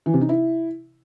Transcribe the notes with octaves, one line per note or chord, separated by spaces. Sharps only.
E3
C3
D#4
E4